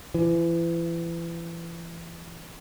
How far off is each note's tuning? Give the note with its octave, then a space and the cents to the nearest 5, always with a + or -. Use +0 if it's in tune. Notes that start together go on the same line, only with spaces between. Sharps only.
E3 +35